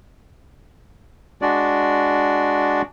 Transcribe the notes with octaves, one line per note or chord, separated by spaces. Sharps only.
G#3 D4 F#4 D5